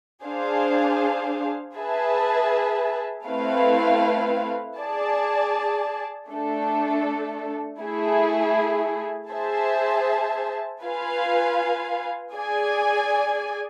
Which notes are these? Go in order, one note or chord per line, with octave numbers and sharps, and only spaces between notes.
D4 G#4 C5 F5
G#4 B4 E5 A5
A3 C4 E4 B4 F5
G#4 D5 A5
A3 D4 A4
A3 E4 G#4
G#4 C5 E5 A5
F4 B4 F5 G#5
G#4 D5 G#5